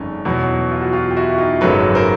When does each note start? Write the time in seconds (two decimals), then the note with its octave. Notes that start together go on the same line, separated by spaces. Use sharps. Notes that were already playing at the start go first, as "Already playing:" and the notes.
Already playing: G1 F2 C#3 C#4 D#4
0.25 E2 B2 F#3
0.71 F4
0.82 F#4
0.93 F4 G4
1.11 G4
1.17 E4 F#4
1.38 D#4 F4
1.61 G#1 F#2 C#3 F#3 A4 B4
1.95 A#4 C5